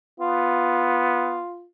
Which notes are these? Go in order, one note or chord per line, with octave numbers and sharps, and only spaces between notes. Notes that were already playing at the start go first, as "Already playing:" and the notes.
B3 F4